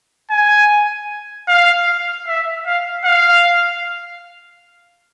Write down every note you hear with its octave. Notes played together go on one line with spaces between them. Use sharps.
G#5
F5
E5
F5
F5